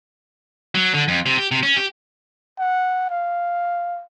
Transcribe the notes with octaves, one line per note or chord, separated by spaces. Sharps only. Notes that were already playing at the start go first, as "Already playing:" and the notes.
F#3
D3
F2
C3
G4
C3
C#4
G4
F#5
F5